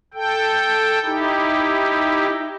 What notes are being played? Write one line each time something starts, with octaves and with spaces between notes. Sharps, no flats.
A4 G5
D#4 E4 G4